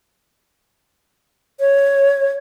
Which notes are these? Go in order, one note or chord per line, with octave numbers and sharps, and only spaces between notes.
C#5